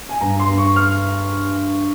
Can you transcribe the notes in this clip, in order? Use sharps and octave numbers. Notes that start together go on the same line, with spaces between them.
G#5
G2 A#5
C6
G2
C#6
F6